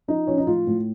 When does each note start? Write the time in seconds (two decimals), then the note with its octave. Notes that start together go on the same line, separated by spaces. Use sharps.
0.08 F3 D#4
0.27 F3 C#4
0.38 D#4
0.47 A2 F4
0.67 A2